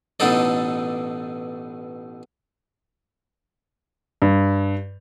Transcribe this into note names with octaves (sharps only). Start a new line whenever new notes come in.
A1 B2 D4 D#4 A4 D5
G2